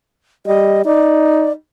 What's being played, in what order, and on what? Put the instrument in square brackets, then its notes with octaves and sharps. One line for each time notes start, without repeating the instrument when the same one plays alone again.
[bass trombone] G3 [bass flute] D#5
[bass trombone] D#4 [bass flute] D5